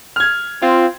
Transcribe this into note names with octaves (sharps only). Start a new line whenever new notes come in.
F6 G#6
C4 F4